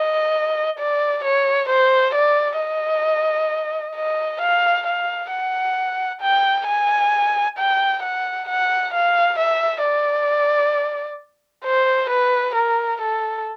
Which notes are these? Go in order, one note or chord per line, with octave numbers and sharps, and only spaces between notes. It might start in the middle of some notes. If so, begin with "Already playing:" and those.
Already playing: D#5
D5
C#5
C5
D5
D#5
D#5
F5
F5
F#5
G5
G#5
G5
F#5
F#5
F5
E5
D5
C5
B4
A#4
A4